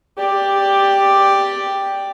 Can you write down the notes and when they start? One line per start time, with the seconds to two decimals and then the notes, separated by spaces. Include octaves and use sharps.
0.18 G4 D5